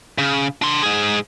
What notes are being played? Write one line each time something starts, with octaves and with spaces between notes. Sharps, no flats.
C#3
D4 C6
G#2 G#4